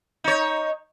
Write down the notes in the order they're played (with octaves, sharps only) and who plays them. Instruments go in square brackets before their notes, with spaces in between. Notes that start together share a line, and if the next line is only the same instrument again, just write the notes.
[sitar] D#4 C#5